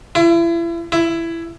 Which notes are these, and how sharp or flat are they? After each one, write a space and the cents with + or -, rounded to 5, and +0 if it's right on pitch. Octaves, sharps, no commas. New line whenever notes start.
E4 +35
E4 +15